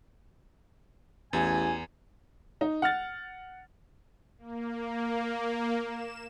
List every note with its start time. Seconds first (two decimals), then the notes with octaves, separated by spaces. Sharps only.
1.33 A1 E2 G#5 G#6
2.61 D#4
2.82 F#5 F6 A6
4.38 A#3
5.83 E7